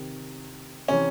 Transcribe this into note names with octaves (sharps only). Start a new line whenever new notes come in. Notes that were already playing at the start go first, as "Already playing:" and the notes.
Already playing: C3 D#3
C3 E3 C#4